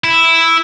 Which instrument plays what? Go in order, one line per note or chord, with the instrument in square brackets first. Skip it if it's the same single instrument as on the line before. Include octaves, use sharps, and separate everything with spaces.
[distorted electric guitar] E4